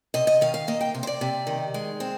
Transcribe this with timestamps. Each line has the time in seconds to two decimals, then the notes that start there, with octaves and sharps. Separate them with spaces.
0.14 C3 D#5
0.27 D#5
0.41 D#3 F5
0.54 F5
0.68 A#3 D#5
0.81 G5
0.95 C3
1.03 C5
1.07 D5
1.21 C3
1.47 D#3
1.74 G#3
2.00 C4